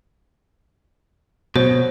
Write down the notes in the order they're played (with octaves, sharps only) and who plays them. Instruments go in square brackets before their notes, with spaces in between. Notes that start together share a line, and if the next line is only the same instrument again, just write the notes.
[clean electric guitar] B2 F#3 [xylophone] C5